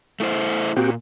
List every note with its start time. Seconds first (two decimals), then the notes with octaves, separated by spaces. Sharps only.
0.20 A3 E4 C5
0.76 A#2 C4 F#4 G4